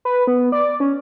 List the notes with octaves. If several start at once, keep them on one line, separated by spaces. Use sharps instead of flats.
B4
B3
D5
C#4